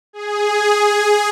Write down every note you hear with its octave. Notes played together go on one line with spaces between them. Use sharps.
G#4